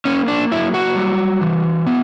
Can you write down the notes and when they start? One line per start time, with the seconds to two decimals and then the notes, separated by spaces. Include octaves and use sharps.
0.05 A#3 C#4
0.28 D4
0.52 F#3 E4
0.74 F#4
0.96 G3
1.41 E3
1.87 B3